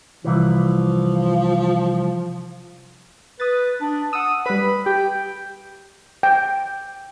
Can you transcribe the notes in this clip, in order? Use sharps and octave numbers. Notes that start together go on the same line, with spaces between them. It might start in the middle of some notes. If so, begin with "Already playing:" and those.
C2 E3 F3
B4 D#6 A6
D4
F#5 D#6 E6
G3 B4 B5
G4 G5
G5